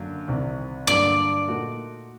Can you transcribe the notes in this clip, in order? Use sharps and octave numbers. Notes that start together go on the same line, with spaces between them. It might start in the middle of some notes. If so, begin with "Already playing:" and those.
Already playing: F#2 D3 F#3 A#3
C2 C3 D#3
G2 D3 F#3 A#3 D5
A#2 A3 D#4 F#4 A#4